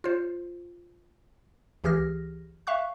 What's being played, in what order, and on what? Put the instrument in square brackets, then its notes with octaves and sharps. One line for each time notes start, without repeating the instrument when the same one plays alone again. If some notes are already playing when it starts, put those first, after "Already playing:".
[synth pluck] F4 C5
C#2 E3 G4 G#4 F6 A#6
E5 F5 C#6 F#6